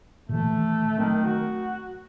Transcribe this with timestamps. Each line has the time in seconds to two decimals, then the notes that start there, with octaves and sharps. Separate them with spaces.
0.29 A#2 D#3 E3 A3
0.98 D#3 F#3 A3 C4
1.24 F#4